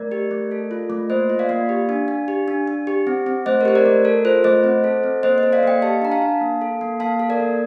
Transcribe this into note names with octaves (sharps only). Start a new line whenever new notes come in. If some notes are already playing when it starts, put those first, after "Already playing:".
Already playing: A3 A#4 D5
G4
A3
A4
F4
A3
A#3 C5 D#5
F4
D5 F5
A#3
G4
D4
D4
G4
D4
D4
G4
C4
C4
A3 C5 D#5
A#4
G4 C5
A#4 D5
A3
A4 A#4
F4 C5
A3 C5 D#5
C4
A4
C4
A#3 C5 D#5
C5 D#5
A4
D5 F5
A#3 D#5 G5
G4 F5 A5
D4 A#5
F5 A5
D4
A#3
A4
A#3
A#3 F5 A5
A4
A#4 D5
A#3